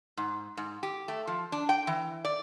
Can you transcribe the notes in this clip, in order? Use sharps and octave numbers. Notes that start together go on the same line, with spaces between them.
G#2
G#2
G4
A3
F3
D4
G5
E3
D5